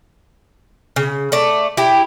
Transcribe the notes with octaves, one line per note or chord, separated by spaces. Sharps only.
C#3
A3 D5
E4 G4